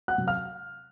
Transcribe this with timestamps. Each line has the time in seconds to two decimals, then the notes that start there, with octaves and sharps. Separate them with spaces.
0.08 F#5 F#6
0.18 C3 F#3
0.27 F5 F6